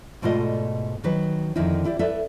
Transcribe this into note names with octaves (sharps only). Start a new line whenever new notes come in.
G#2 B2 A3 F4 D5 D#5
D#3 F#3 B4
F2 D3 D#3 D#4 E4
E4 G4 D5
A4 B4 D5 E5